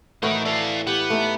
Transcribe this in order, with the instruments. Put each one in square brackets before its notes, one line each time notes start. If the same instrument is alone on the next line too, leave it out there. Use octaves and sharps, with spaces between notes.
[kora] A2 E3 F#4 [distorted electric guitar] D#4 A#4
[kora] A4 [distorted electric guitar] D5 F5
[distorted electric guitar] B3 [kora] G4
[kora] A3 D#4